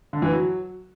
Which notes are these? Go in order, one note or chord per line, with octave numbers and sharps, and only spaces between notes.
D3
E3
F#3